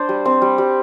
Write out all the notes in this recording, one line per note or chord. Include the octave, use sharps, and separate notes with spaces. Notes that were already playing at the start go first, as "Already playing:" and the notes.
Already playing: D4 C5
G3
C4
G3
G3